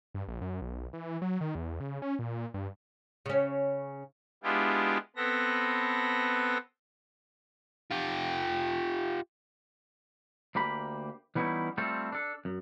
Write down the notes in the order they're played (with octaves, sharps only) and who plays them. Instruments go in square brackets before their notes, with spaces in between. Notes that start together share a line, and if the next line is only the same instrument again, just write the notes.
[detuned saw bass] G2
A#1
F#2
B1
E3
F#3
D#3
E2
C#3
C#4
A#2
G2
[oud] C#3 C#4
[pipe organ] G#3 B3 D4 E4 F4 G4
B3 C4 A4 B4 A#6
[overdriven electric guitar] F4 G4
[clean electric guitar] D2 A#3 G4 B5
E3 G3 B3 C#4 D#4 E4
G3 A3 C4 F4 A4
D4 A4
F#2